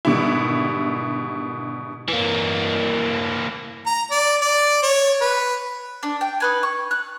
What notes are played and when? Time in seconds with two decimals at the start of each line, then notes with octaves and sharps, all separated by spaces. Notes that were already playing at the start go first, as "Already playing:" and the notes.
0.05 G#2 B2 D3 D#3 G3 E4
2.08 E3 A#3
3.86 A#5
4.11 D5
4.41 D5
4.83 C#5
5.21 B4
6.03 D4
6.21 G5
6.40 D#4 B4 G#5
6.63 C#6
6.91 F#6